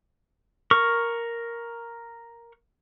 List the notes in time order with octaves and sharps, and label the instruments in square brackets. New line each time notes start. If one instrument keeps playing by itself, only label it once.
[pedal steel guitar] A#4 C#6